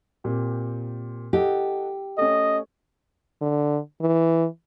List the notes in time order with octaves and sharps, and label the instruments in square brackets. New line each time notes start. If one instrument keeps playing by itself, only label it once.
[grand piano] A#2 C4 G4
[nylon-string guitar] G4 [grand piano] A4 D#5 F#5
[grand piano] A3 C#4 [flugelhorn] D#5
[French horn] D3
E3